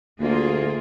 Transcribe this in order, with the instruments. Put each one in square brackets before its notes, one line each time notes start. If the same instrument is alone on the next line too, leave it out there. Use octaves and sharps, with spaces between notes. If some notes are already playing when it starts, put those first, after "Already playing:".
[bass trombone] D2 [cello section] A#3 F4 G#4